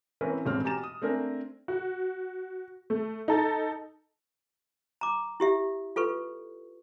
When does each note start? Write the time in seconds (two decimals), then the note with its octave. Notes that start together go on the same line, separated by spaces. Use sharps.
0.21 E3 C4 C#4 A#4 B4
0.45 E1 A1 C4 G#4 F6
0.64 B2 G4 G#5 A#5 A6 E7
0.83 D#6
1.02 A3 C4 D4 A#4 G#5
1.68 F#4
2.90 A3
3.28 D#4 A4 A6
5.01 A#5 D6
5.40 E4 G4 E5
5.96 F4 A4 B4 C#6